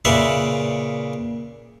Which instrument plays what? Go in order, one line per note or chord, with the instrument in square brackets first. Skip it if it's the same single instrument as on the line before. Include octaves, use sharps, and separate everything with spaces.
[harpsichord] A#2 C#3 B4 D5 E5 F5